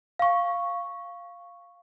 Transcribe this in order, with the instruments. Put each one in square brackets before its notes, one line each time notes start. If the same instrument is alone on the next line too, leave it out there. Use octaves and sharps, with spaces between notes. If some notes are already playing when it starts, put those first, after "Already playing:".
[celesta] F5 C#6